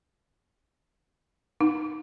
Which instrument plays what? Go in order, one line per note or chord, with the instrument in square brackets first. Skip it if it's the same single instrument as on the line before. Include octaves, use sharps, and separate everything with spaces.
[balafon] D#4